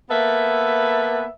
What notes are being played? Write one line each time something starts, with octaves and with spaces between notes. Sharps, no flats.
A#3 B3 A4 B4 E5